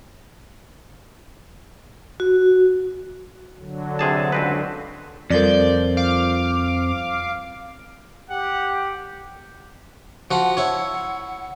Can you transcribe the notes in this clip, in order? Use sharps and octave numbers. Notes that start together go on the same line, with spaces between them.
F#4
D3 F#3
C3 G#4 A5
C#2 C4 B4
F2 F3 G3 A4 A#4 D5 G6
F5 D6
G4 F#5
F3 F#4 F#5
E4 C#5